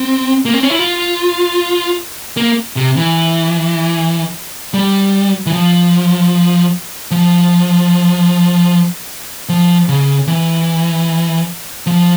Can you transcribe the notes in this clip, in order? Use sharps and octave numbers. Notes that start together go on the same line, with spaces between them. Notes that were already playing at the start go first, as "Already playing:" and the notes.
Already playing: C4
A#3
C4
C#4
E4
F4
A#3
C3
E3
G3
E3
F3
F3
F3
C#3
E3
F3